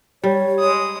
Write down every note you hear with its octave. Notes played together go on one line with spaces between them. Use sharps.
G3 C#5
G#3 D#6